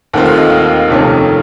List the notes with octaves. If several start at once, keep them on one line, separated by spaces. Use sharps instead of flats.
D#2 D#3 A3 C4 F4 F#5
F5
D#5
F5
F2 C3 D#3 A3 C#4